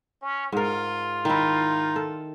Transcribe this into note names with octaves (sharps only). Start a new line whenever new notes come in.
C#4
G#2 F4 A#4
D#3 D#4 E4
A4